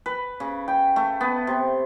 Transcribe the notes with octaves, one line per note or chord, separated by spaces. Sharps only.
B4
C#3
G5
A3
B3
C3